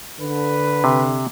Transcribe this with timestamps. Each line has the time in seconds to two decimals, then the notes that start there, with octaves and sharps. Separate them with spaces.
0.21 D3 B4
0.84 C3